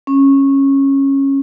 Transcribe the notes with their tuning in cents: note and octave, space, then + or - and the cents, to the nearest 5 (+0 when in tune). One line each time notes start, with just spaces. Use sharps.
C#4 -15